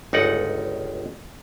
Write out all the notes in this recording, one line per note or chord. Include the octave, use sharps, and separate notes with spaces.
G1 C#2 D#4 D5 F#5